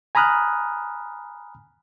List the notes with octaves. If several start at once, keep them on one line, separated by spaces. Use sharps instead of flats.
G#5 A#5 B5 D#6 F6 F#6